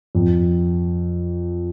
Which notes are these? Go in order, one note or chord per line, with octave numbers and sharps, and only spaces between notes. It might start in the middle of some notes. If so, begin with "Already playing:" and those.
F2